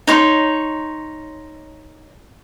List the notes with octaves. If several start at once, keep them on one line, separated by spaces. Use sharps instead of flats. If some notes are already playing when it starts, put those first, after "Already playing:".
D#4 C#5 C6